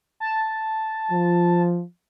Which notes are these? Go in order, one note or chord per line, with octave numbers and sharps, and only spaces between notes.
A5
F3